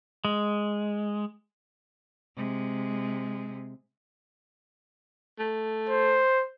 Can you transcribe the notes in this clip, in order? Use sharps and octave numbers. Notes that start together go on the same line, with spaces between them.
G#3
C3 G#3
A3
C5